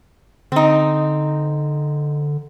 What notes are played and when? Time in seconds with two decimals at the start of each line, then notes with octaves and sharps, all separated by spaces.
0.52 D3 C4 D#4